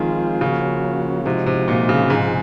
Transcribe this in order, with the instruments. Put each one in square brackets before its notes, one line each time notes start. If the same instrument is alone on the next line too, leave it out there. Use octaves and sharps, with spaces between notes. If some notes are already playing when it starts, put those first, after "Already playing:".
Already playing: [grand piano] D#3 [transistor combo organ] F3 G#3 C4 F4 G#4
[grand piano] C#3 [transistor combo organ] F3 A#3 C#4 F#4
[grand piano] C3 [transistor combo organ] F3 G#3 D#4 F#4
[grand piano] C3
A#2
C#3
[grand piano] G#2 [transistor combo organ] C3 F3 G#3 D#4 G#4